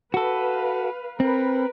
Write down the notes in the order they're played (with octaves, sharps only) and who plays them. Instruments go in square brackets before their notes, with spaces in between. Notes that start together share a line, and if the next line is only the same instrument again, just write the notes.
[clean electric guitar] F#4 A4 [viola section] B4 F5
[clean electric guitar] C4 [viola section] A#4 B4